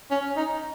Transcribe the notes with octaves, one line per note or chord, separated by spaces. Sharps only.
C#4
D#4